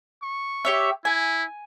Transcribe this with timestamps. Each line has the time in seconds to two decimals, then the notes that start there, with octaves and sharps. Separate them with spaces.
0.23 C#6
0.65 G4 C#5 E5
1.05 E4 G#5